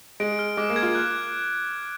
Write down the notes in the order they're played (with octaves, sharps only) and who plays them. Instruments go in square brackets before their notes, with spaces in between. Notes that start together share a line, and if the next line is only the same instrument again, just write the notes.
[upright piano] G#3 [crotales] D7
[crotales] F6
[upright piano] G#3 [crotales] D6
[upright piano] A#3
[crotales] G#6
[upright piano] F4
[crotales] F#6